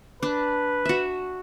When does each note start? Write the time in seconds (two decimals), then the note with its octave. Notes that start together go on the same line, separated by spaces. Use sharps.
0.23 D4 B4
0.85 F#4 E5